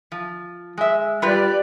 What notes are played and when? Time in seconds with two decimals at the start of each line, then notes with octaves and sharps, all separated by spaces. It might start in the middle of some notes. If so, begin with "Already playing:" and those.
0.12 F3
0.78 G#3 E5
1.22 G3 F4 G4 B4 D5